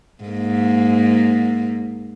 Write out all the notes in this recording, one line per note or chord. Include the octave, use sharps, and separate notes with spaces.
G#2 A#3